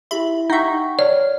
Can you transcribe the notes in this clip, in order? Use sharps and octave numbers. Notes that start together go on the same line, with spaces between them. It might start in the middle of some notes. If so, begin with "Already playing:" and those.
E4 G4 E5 B5
D#4 E5 F#5 G5 C#6
C#5 D5 F6